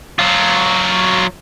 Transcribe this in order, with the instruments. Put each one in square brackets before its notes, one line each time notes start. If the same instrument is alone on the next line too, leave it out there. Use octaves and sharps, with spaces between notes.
[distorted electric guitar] F#3 F4